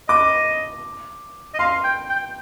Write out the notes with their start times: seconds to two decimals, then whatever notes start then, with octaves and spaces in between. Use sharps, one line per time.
0.09 D#5 D6
1.54 D#5
1.59 F5 C6
1.84 G5
2.10 G5